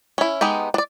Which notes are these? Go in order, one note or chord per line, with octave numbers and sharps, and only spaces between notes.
C#4 E4
G#3 B3 D#4 G4
D4 D5